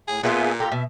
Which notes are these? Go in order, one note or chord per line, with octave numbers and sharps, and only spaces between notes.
A2 G#4
A#2 B3 F4 G#4 C5 E5 G#5
F4 G4 A4 A#5
B2 E5